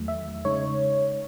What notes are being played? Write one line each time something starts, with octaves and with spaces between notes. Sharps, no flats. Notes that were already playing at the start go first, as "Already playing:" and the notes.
Already playing: E2 D#3 F#3 A3
E5
C#3 G#3 D#4 C#5